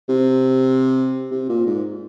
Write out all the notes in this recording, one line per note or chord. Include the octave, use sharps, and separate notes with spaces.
C3
C3
A#2
G#2